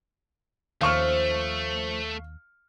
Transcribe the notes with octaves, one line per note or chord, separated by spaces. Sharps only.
D#2 F3 A3 C#4 F5 C#6 F6